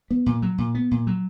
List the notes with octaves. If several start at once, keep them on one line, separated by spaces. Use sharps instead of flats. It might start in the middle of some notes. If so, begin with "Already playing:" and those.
B3
A#2
F#3
A#2
B3
A#2
F#3